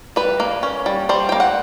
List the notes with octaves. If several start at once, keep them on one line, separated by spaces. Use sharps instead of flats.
G3 B4
A#3
C#4
G3
G3 C5
A#3 G5
F#5